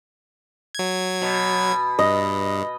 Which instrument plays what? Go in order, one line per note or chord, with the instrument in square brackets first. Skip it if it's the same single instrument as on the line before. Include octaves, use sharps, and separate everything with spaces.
[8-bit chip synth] F#3 G#6
[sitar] B2
[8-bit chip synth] G2 [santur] D#5